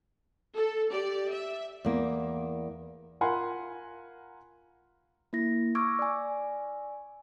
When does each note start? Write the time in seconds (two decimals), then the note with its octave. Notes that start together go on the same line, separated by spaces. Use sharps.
0.56 A4
0.91 G4 D5
1.32 E5
1.85 E2 A#3
3.21 F4 A#4 F#5 G#5 B5 C6
5.33 A#3 E4 A#6
5.75 C#6 D6 E6 F6 G#6 D7
5.99 D5 G#5